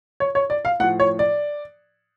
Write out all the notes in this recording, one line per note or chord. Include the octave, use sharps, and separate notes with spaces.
C#5
C#5
D5
F5
A2 F3 F#5
C#5
D5